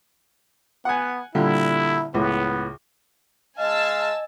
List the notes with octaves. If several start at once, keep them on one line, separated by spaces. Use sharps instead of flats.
B3 F#5 G#5
A#2 D3 G3 E4
C#2 A2 B3
G#3 D#5 F5 G#5 A5 E6